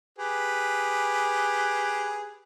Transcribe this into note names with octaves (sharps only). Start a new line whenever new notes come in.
G4 G#4 B4